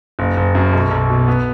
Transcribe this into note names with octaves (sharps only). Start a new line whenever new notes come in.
F#1
F#1
F#2
B1
B1
B2
B3